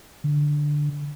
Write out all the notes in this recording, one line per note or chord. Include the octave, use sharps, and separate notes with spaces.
D3